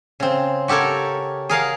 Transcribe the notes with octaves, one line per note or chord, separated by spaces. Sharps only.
C#3 C4
F#4 G4 A4 A#4 C#5
G#4 A#4 F5 F#5